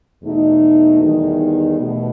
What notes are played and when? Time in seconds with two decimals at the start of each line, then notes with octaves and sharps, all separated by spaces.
0.23 E2 B2 A3 D#4
1.01 E2 D#3 G3 D#4
1.80 B2 A3